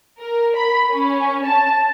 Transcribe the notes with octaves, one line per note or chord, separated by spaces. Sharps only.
A#4
B5
C#4
A5